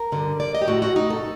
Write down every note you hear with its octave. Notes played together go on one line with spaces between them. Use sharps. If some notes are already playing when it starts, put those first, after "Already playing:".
Already playing: A#4
G2 D3
D5
D#5
G4
A2 F#4
F#4
D#4
A4